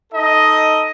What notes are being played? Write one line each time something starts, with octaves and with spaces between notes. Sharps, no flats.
D#4 A4 D#5